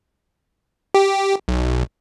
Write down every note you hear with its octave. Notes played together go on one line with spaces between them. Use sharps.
G4
B1